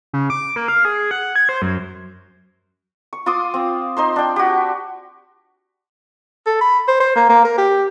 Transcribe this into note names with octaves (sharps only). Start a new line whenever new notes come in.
C#3
D6
A#3
F5
G#4
F#5
G#6
C5
F#2
C#6
F4 C6 D6 D#6
C4
D#4 C5 C6
D4 G5
F#4 G4
A4
B5
C5
C5
A#3
A#3
A#4
G4